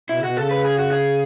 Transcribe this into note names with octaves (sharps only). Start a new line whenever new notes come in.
B2 E4
C#3
B2 F#4
C#3 A4
B4
G#4
F#4
G#4